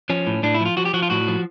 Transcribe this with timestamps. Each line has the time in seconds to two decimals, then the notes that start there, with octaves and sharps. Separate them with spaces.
0.10 F3 C#4
0.27 A2
0.43 A2 D4
0.55 E4
0.60 F3
0.66 F4
0.77 F3 F#4
0.85 G4
0.94 F3 F#4
1.03 F4
1.10 A2 F#4
1.28 F3